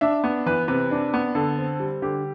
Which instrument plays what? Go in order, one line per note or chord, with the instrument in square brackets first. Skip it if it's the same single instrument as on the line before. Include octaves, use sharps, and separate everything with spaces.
[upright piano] D4 E5
B3
E3 B4
C3 B4
D4
B3
D3 A4
C4
G3
D3 G4